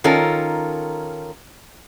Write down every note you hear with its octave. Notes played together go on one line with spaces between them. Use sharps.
D#3 C#4 F4 A4 A#4